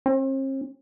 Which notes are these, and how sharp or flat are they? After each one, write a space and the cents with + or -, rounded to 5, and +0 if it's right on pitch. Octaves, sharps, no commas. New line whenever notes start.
C4 +45